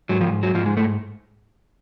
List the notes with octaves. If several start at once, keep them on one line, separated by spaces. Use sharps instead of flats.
G#2 F#3
F3
F#3
G#2 F3
G#3
A3